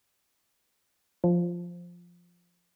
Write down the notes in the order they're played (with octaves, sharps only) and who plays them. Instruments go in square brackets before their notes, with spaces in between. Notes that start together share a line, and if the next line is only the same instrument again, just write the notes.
[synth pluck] F3